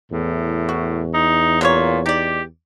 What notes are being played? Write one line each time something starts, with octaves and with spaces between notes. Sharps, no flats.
E2 A2
F#4
D#4
A#2 F#3 A#3 C#5
D#4 G4 D5